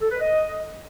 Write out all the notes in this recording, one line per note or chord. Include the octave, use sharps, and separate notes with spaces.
A4
B4
D#5